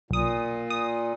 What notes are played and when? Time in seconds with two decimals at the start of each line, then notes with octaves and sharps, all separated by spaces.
0.11 B1 A#2 D#6
0.70 D#6